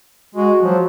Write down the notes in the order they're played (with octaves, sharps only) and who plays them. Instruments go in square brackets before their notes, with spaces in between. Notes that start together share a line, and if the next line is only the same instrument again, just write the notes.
[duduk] G#3 [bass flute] F#4
[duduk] F3 [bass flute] F#3